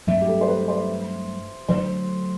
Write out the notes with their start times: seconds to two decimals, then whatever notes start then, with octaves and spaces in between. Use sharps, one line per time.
0.07 G2 F#3 A3 C4 E5
0.22 G4
0.28 A4
0.41 C5
0.48 B4
0.68 C5
1.68 D3 F#3 A3 C5